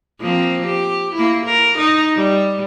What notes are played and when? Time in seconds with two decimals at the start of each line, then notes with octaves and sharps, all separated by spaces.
0.20 F3 A#3 C4
0.66 G4
1.15 A#3 E4
1.45 A#4
1.78 D#4
2.16 G3